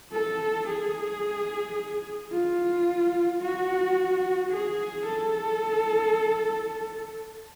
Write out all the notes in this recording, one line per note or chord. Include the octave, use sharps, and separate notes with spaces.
A4
G#4
F4
F#4
G#4
A4